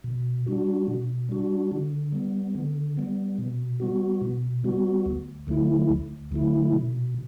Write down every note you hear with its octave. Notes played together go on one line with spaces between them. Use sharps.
B2
G3 D4 F#4
B2
G3 D4 F#4
D3
G3 B3
D3
G3 B3
B2
G3 B3 F#4
B2
G3 B3 F#4
D2
D3 F#3 A3 E4
D2
D3 F#3 A3 E4
B2